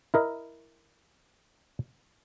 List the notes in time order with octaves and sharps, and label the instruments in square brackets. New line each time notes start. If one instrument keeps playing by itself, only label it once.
[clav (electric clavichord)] E4 A#4 D#5